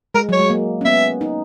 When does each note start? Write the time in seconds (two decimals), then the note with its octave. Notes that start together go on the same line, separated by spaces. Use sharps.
0.14 G#3 A#4
0.29 F#3 C#5
0.40 G#3
0.50 A#3
0.81 C#4
0.85 B3 E5
1.21 D#4